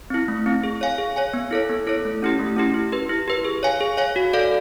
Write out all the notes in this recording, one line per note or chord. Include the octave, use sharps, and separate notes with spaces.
C4 E4
A3
C4 E4
G#4
C#5 F5 G#5
G#4
C#5 F5 G#5
B3
E4 A4 C#5
B3
E4 A4 C#5
A3
C#4 E4 G4
A3
C#4 E4 G4
E4
G4 B4
E4
G4 B4
G#4
C#5 F5 G#5
G#4
C#5 F5 G#5
F#4
A4 D5 F5